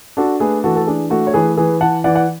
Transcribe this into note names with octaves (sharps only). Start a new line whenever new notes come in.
D4 F#4 A4
A3 G#4 B4
E3 F#4 A4
A4
D4 G#4
A3 F#4 A4
C#5
E3 G#4 B4
E3 G#4 B4
E3 F#5 A5
E3 D5 F#5
F#5